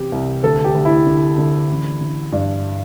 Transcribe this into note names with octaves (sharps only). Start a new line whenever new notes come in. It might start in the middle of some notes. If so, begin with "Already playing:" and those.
Already playing: C3 E3 G4
C2
D2 A4
G4
D2
E4
D3
D3
A1
D3
G2 D4